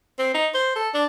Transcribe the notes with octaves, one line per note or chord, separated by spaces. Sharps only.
C4
D#4
C5
A4
D4